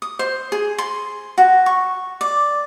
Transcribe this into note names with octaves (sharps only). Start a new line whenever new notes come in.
D#6
C5
G#4
C6
F#4
C#6
D5